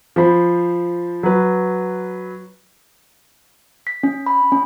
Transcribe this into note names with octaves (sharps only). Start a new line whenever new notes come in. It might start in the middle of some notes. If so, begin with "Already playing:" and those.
F3 C5 B5
F#3 B4
B6
C#4
B5
C#4